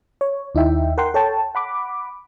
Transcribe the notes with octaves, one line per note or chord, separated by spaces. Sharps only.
C#5
D#2 D#4 E4 E5 G5
A#4 F#5 G5 C6
A4 C#5 G5 A5
F#5 B5 D6